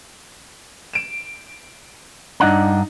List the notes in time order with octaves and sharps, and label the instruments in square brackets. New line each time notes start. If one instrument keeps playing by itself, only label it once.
[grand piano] D7 E7
[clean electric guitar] G2 F#5 A#5 [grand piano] D4 D#4